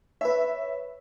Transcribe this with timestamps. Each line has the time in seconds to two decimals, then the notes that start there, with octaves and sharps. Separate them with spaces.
0.21 B4 C#5 E5